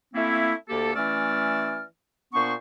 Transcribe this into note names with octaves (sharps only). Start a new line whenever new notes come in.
A3 A#3 C4 C#4 E4
D2 A#3 G4 A4
E3 A3 C#4 D5 E6 F6
A#2 B3 D4 C5 C#6